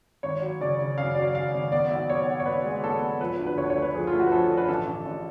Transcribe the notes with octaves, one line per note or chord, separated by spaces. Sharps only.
G#1 C#5
F#3
C#3 D5
C#3
F#2 F5
F#3 D5
F5
F#3 F5
G#1
B3 D5
B1
B3 C#5
B3
C#5
B3 B4
G#3
B3 A4
B3
F3 B4
D2
B4
D2 C#5
C#5
A3
B4
F3 G#4
F4
A3
F#4
B4
F3 A4
D3
B4
A1 A4
A1
A1